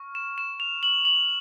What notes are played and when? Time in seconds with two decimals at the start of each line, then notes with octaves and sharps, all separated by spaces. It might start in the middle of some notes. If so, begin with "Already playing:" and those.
Already playing: C#6 F6
0.15 E7
0.38 E7
0.60 F7
0.83 F#7
1.05 F#7